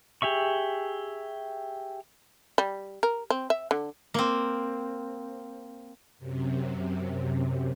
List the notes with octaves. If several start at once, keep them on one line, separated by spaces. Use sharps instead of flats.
G4 G#4 E5 C#6
G3
A#4
C4
E5
D3
A#3 C4
F#2 C3